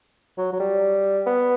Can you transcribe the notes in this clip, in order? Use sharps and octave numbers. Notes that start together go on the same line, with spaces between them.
F#3
F#3
G3
B3